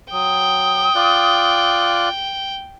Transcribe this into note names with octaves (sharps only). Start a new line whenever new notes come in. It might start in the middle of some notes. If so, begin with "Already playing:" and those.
F#3 G5 D#6
F4 D5 F#6